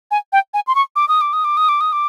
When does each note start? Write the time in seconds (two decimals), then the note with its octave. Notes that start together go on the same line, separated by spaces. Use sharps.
0.11 G#5
0.32 G5
0.54 G#5
0.67 C6
0.75 C#6
0.96 D6
1.08 D#6
1.21 D6
1.33 D#6
1.44 D6
1.57 D#6
1.69 D6
1.81 D#6
1.92 D6